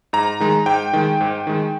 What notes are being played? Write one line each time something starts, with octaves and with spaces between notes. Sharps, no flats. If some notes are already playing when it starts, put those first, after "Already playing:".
G#2 A#5
D#3 G#3
G#2 G5
D#3 G#3
G#2
D#3 G#3